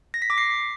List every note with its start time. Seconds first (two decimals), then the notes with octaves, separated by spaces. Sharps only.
0.14 A#6
0.22 B6
0.30 D6
0.38 C7